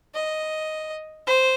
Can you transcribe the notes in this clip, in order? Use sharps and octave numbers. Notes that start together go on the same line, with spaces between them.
D#5
C5